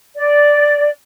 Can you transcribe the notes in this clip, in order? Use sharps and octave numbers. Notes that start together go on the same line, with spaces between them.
D5